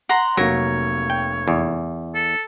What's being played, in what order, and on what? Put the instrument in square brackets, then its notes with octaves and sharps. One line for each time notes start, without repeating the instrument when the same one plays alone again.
[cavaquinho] F#5 A#5 C6
[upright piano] F1 A#3 [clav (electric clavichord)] F#3 [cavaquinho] A#4 [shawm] C#5
[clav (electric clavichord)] G5
E2
[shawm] A4